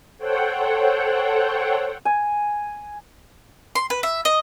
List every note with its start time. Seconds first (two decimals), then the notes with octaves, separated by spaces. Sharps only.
0.18 A4 C5 C#5 F#5 G5
2.05 G#5
3.76 C6
3.90 B4
4.03 E5
4.25 D#5